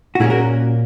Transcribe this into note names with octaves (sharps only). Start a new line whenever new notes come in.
F#4
A#2 A#3 C#4 E4 G#4
F#4 A#4